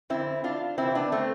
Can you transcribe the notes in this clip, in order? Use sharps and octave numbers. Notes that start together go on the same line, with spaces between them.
F2 D3 C4 E4
D4 F4
E2 C3 E3 C4 E4
B3 D4
A3 C4